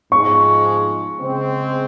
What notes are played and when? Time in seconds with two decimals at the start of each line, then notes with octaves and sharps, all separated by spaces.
0.12 G#2 F3 G#3 C#6
1.21 C#3 G#3 C4